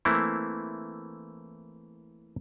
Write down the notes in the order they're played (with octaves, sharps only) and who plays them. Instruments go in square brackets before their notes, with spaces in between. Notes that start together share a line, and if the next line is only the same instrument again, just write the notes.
[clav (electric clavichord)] E3 A3 A#3 C4 E4